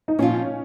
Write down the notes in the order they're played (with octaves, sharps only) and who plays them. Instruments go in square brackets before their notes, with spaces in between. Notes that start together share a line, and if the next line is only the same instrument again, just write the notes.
[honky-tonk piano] D#4
[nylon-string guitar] A#2 F3 C4 F4 [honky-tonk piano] C#4